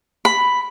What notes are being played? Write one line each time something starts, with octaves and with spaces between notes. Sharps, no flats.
B5